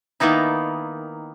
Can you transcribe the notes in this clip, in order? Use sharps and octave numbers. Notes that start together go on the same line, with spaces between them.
D#3 A#3 B3 D#4 E4